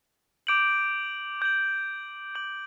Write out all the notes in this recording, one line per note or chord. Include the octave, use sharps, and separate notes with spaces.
D6 G6 D7 F#7
D6 G6 D7 F#7
D6 G6 D7 F#7